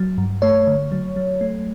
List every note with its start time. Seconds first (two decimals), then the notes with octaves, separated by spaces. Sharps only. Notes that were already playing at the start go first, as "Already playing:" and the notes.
Already playing: F#3
0.18 G2
0.42 A3 C#5
0.67 D3
0.92 F#3
1.16 F#3
1.41 A3